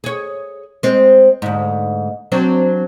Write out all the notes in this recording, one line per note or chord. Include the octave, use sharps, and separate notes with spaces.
G#4 C#5
G#3 C4
D2 G#2
F#3 C4 D4